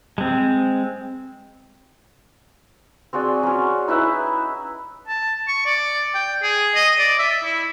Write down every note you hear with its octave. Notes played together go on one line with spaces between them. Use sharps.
G#3 C4
C4 F#4 G#4 D5
F#3 C#4
D#4 E4 B4 E5
A5
C#6
D5
G5
G#4
D#5
D5
E5
E4